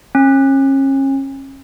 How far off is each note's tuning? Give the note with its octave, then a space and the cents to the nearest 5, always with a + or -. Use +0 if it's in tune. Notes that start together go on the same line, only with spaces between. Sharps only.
C#4 -35